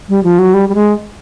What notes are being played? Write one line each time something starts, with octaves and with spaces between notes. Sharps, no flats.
G3
F3
F#3
G3
G3
G#3